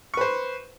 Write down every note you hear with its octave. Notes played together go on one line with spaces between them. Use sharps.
B4 C5 C#6